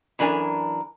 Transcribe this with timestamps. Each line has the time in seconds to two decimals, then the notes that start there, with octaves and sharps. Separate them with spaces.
0.19 F#2 E3 D4 A#4 G#5